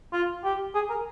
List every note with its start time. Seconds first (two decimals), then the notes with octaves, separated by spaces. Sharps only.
0.13 F4
0.44 G4
0.75 G#4
0.90 A#4